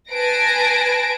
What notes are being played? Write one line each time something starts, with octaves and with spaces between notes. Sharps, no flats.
B4 G#5 A5 A#6 C7 D7